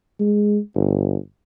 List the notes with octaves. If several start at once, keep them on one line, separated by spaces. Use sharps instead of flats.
G#3
G1